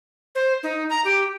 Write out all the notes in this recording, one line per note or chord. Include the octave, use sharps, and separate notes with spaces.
C5
D#4
A#5
G4